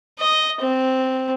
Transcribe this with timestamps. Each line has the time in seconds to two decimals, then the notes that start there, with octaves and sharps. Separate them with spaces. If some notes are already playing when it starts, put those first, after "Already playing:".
0.19 D#5
0.61 C4